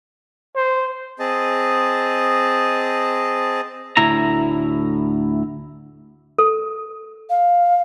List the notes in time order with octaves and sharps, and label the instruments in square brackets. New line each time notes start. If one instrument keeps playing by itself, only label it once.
[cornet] C5
[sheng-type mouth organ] C4 G#4 D#5 A5
[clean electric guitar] D2 A2 E4 A#5
[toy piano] A4
[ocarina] F5